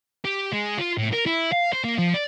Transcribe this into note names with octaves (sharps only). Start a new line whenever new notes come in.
G4
G#3
F4
A2
A#4
E4
F5
C5
A#3
F3
D5